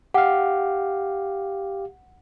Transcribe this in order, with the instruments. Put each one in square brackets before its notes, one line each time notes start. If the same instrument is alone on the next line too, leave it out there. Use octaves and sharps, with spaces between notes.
[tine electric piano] G4 F5 [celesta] F#5